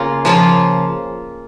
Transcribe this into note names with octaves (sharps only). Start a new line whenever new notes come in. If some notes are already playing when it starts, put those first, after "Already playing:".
Already playing: C#3 A#3 F4
C#3 F3 A#3 F4